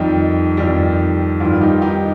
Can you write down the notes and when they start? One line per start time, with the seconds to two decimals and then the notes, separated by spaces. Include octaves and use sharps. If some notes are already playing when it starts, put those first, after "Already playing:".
Already playing: F2 D#3 G3 D#4 G4
0.57 F2 D#3 G3
1.40 G2 D#3 G3 F4
1.61 D#4 G4
1.81 D#4 G4